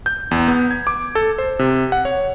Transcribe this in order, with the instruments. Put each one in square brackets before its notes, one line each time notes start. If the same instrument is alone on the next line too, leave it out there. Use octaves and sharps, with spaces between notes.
[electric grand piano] G6
E2
B3
G#6
D6
A4
C5
C3
F#5
C#5